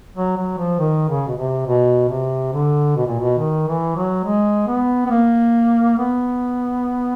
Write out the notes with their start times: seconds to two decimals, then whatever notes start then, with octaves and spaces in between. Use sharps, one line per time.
0.16 F#3
0.37 F#3
0.58 F3
0.79 D#3
1.09 C#3
1.28 B2
1.37 C3
1.67 B2
2.09 C3
2.53 D3
2.96 B2
3.07 A#2
3.20 B2
3.38 D#3
3.68 E3
3.97 F#3
4.25 G#3
4.68 B3
5.06 B3
5.11 A#3
5.98 B3